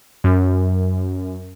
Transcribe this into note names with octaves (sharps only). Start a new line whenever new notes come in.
F#2